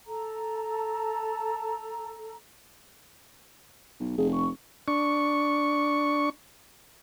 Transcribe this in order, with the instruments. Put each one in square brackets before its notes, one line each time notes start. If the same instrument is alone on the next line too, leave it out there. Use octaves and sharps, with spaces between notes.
[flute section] A4 A#5
[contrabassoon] B1
[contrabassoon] F1 [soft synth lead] G#4
[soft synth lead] C#6
[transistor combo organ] D4 C#6